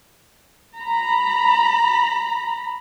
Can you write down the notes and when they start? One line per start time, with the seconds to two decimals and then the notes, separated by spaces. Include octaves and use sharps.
0.78 A#5 B5